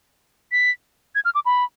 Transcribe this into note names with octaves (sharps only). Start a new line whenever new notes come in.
B6
G#6
F6
D6
B5